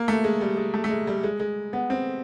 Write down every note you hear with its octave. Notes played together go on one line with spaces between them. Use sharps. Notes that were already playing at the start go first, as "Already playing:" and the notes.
Already playing: A#3
A3
G#3
G3
G#3
A3
A3
G#3
G3
G#3
G#3
B3
C4